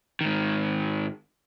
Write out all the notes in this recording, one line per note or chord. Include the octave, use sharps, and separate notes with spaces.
G#2 D#3